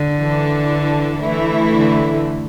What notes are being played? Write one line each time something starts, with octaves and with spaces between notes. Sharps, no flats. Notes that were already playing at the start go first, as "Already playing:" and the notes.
Already playing: D3
E3 D4 A4
E3 A3 E4
D3